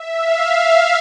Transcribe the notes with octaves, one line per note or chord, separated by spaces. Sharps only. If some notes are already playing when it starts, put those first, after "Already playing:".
Already playing: E5
F5